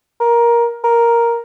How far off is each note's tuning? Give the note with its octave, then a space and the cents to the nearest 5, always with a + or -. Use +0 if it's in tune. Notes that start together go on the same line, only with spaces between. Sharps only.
A#4 +15
A#4 +5